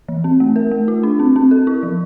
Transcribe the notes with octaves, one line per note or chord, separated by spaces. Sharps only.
E3
C4
A3
A#4
A3
F4
D4
C4
C4
A4
E4
F3